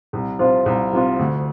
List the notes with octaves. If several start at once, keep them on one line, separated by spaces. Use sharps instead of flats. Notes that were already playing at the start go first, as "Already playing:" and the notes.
C2
C3 F3 C4 F4
C2
C3 F3 C4 F4
D2